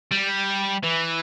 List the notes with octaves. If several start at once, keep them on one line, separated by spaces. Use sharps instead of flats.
G3
E3